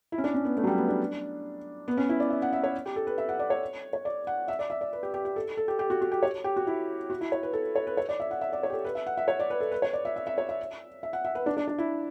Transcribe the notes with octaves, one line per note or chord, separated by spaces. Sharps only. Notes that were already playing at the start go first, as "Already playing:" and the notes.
E4
C#4
D4
C#4
B3
A3
F#3
G3
B3
D4
B3
C#4
E4
D5
E5
F#5
E5
C#5
G4
A4
B4
E5
F#5
D5
C#5
C#5
D5
F#5
E5
D5
E5
D5
B4
G4
G4
G4
A4
A4
G4
G4
F#4
F#4
G4
C#5
G4
F#4
E4
F#4
E4
C#5
B4
A4
C#5
B4
C#5
D5
E5
F#5
E5
D5
C#5
G4
A4
B4
E5
F#5
E5
C#5
D5
B4
A4
B4
C#5
D5
E5
E5
E5
C#5
E5
E5
F#5
E5
B4
D4
D4
D4
E4